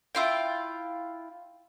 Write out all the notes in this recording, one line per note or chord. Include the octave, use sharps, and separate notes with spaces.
E4 F4 G5